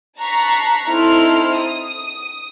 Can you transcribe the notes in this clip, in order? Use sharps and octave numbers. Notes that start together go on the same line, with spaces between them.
A5 A#5 C#6 F#6 B6 C7
C4 D#4 E4 A4 C6 F6
D#6